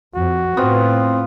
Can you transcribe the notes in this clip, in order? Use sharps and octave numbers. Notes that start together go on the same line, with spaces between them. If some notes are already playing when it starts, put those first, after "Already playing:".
F2 F#4
A2 B3 C4 F4